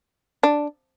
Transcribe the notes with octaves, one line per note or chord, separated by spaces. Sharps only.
D4